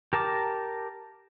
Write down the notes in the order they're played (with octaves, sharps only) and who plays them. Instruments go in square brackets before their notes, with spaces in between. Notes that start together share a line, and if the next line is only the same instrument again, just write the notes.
[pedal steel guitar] G4 A#4 A5 A#5 D6